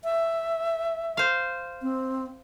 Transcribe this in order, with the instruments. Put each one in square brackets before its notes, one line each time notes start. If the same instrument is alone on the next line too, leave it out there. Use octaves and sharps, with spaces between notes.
[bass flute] E5
[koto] C5 F5
[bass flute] C4